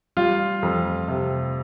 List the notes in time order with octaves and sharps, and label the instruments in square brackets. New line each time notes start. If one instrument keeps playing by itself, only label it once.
[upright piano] G3 [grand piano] F4
[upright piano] F2
C3